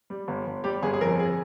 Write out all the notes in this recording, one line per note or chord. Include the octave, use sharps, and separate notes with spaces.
G3
G1
G1
G3 G4
G1 G#4
G#4
F2 A#4
G#4